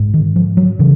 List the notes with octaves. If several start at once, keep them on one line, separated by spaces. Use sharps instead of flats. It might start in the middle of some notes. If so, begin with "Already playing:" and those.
Already playing: G#2
D#3
F3
F#3
C#3 E3